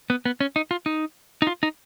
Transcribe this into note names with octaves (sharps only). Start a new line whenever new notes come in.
B3
B3
C#4
D#4
F4
D#4
D#4
F4
D#4